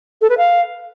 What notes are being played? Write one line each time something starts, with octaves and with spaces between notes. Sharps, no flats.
A4
B4
F5